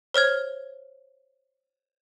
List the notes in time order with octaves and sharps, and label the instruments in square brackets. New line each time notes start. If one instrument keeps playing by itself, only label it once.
[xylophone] C5 C#5 F6 G#6